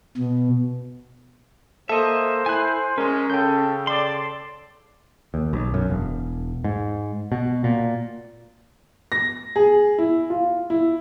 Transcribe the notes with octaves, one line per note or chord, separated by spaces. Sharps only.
B2
A#3 A4 C5 D#5 E5
E4 G#5 F#6
G#3 C#4 A#4 G#5
C#3 A4 G5 G6
A4 D5 C6
D#2
B1
F#2
E1
G#2
B2
A#2
A#6
G#4
E4
F4
E4